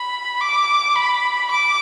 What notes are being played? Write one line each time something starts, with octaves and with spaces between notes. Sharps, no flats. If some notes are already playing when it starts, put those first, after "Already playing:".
Already playing: B5
D6
B5
D6